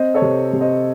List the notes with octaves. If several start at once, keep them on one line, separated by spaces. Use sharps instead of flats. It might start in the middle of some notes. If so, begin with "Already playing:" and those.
Already playing: C4 C5 D#5
A4 C#5
C3
C3
C5 D#5